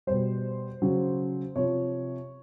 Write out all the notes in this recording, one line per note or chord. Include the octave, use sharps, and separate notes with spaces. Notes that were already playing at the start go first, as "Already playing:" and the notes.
B2 G3 C5
C#3 F#3
C3 F3 C#5